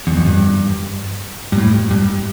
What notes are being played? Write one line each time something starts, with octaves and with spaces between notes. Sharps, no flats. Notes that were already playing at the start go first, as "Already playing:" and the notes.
E2
F2
G2
G2
A2
G2